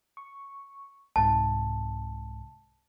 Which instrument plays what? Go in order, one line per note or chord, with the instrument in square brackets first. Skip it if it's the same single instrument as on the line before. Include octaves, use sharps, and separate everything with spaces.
[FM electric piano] C#6
[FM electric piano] C2 G#2 C3 [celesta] A5